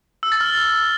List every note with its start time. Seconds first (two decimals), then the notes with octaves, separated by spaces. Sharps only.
0.23 E6
0.32 A6
0.41 F6